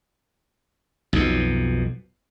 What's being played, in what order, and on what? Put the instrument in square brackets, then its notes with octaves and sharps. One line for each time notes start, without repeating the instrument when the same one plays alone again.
[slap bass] B1 F2 B2